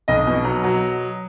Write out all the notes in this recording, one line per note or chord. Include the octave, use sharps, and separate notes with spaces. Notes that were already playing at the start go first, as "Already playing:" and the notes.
B1 D#5
B2
F#3
F#3